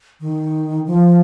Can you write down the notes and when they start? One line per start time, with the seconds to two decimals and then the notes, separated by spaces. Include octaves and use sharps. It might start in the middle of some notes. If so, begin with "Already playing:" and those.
0.20 D#3
0.86 F3